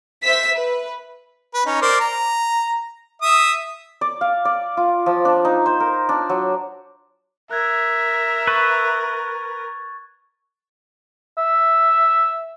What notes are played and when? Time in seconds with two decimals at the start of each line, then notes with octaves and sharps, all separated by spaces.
0.23 C5 E5 E6 B6
0.53 B4
1.54 B4
1.66 C#4 D#4
1.82 A#4 C5 D5
2.00 A#5
3.22 E5 D#6
4.01 D5
4.21 F5
4.45 D5
4.77 F4
5.06 F3
5.25 D4
5.45 D#4
5.66 C5
5.80 A#4
6.09 D4
6.29 F#3
7.51 A#4 E5 F#6 G#6
8.47 B4 C#6 A6
11.38 E5